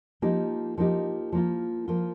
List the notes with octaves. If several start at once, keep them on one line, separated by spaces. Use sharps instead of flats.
F3 A#3 D#4 G4
F3 A#3 D#4 G4
F3 A#3 F4
F3 A#3 F4